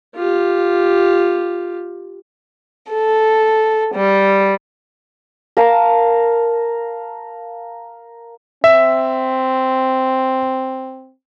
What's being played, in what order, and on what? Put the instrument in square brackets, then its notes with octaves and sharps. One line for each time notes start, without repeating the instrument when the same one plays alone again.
[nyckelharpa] F4 G4
[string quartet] A4
G3
[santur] A#4 F5 A5 A#5
[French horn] C4 [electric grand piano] E5